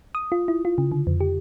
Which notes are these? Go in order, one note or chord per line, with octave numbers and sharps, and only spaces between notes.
D#6
F4
E4
F4
C#3
D3
F2
G4